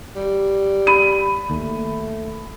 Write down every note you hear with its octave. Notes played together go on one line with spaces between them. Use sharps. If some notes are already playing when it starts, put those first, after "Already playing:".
G3
B5 D#7
D#2 A3